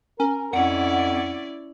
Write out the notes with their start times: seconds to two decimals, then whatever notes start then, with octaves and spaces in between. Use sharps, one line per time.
0.20 C#4 A#4
0.53 F2 C#4 E4 D5 F#5